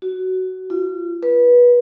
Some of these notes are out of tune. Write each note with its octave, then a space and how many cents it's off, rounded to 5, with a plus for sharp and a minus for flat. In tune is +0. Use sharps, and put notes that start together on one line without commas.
F#4 +15
F4 -35
B4 -20